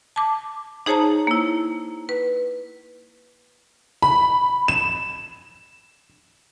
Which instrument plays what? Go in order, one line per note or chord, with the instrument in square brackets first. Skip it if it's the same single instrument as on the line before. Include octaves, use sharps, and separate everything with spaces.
[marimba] A5 D6
D#4 G#4 C5 C#5 A5 A#5
A#3 E4
B4
[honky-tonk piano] B5
E7